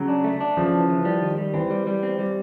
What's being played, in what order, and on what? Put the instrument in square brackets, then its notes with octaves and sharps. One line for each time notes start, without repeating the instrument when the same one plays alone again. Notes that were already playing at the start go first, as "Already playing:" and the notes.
Already playing: [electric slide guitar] C#3 [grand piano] F#3
[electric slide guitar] D4
A3
D4
[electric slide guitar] C#3 [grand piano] F3
[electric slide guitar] E3
E3
G3
D#3
G3
[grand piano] E3 [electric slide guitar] C4
[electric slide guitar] G3
G3
C4
G3